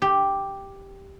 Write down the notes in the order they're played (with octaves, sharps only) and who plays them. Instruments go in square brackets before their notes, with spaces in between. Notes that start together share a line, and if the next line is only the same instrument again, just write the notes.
[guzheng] G4